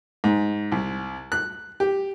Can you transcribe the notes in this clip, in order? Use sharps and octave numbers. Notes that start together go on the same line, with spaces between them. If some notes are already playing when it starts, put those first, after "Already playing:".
G#2
C2
F#6
G4